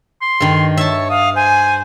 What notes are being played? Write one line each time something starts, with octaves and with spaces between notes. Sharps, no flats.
C6
G2 D#3
C#5 E5 A5
F5 D#6
C5 G#5